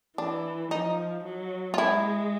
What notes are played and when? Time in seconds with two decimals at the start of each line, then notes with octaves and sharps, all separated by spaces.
0.18 E3 D4
0.71 F3 D#4
1.24 F#3
1.74 F4
1.78 G#3 E4